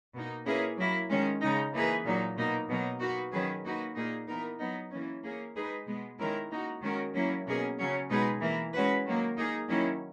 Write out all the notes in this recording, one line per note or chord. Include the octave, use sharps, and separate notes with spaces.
B2 A#3 D#4
A#3 C#4 E4 G#4 B4
F#3 A#3 E4
D#3 G#3 C#4
C#3 G#3 D#4
E3 A#3 D#4 G#4 B4
A#2 F#3 A#3 D#4
B2 A#3 D#4
B2 F#3 A#3 D#4
A#3 D#4 F#4 B4
D#3 F#3 C#4 G#4 B4
A#3 D#4 F#4 B4
A#2 A#3 D#4 G#4
E3 B3 D#4 A#4
F#3 B3 D#4
E3 A#3 C#4
A#3 C#4 G#4
G#3 D#4 G#4 B4
B2 G#3 B3
D#3 G#3 C#4 E4 A#4
A#3 D#4 F#4
D#3 G#3 C#4 F#4 A#4
F#3 A#3 C#4 E4
B2 A#3 C#4 G#4
C#3 F#3 C#4
B2 G#3 D#4 G#4 B4
E3 A#3 E4
G#3 C#4 F#4 B4
D#3 F#3 A#3
A#3 D#4 G#4
D#3 F#3 A#3 C#4 E4